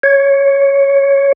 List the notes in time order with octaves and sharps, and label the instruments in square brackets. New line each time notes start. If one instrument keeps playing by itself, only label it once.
[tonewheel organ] C#5